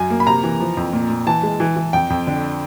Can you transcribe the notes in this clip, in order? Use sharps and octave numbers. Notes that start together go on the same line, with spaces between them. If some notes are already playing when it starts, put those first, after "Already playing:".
Already playing: F#2 G#5
A#3
B5
C3 A#5
E3
F3
F2
A#2
A#2
E3 A5
G#3
E3
E3
F2 G5
F2
D3